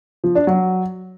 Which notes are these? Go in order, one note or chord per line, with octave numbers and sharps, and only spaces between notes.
F3
D4
F#3